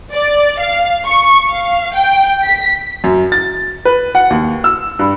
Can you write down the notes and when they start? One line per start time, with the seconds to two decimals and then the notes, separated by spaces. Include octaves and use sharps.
0.13 D5
0.60 F5
1.06 C#6
1.49 F5
1.95 G5
2.44 B6
3.04 F#2
3.32 A6
3.85 B4
4.15 F#5
4.30 D#2
4.64 E6
4.99 G2